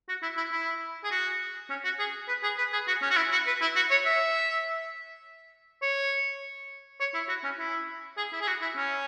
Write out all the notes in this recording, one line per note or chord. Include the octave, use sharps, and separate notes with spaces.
F#4
E4
E4
E4
G#4
F#4
C#4
F#4
G#4
B4
G#4
B4
G#4
F#4
C#4
F#4
E4
F#4
B4
E4
F#4
C#5
E5
C#5
C#5
E4
F#4
C#4
E4
G#4
E4
G#4
F#4
E4
C#4